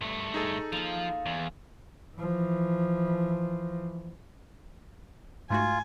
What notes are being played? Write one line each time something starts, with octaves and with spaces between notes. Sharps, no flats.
G2 A3
D#4 G#4 A4
F3 A#3 F4
E2
E3 F3
G#2 A3 F4 F#4 G#5